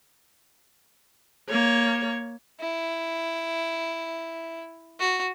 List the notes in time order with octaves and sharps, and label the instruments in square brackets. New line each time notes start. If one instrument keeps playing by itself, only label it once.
[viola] A#3 C#5
[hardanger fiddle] E4
F#4